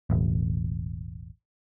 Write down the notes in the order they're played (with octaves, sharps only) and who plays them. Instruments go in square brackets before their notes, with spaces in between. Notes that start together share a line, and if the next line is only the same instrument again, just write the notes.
[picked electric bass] E1 A1